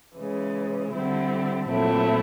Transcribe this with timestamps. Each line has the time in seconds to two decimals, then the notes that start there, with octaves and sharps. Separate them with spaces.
0.18 C#3 E3 G#3
0.93 D3 G3 C4 E4
1.68 A#2 F#3 A3 C4 E4